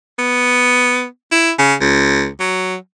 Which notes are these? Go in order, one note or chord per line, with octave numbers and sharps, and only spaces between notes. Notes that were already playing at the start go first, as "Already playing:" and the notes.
B3
E4
C#3
C#2
F#3